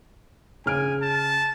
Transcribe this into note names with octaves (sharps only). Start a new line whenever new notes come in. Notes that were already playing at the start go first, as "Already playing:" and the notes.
C#3 G#5 F6 D7
A5